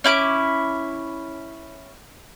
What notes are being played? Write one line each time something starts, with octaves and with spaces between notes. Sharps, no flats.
C#4 E4 D6